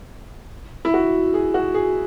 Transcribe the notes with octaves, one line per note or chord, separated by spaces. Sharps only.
E4
F#4
G#4
F#4
G#4